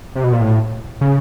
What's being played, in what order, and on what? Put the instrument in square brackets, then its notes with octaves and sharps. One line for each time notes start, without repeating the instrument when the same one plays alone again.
[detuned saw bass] C3
B2
A#2
A2
C#3